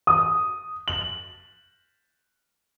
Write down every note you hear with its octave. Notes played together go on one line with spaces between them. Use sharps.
D#6
F#7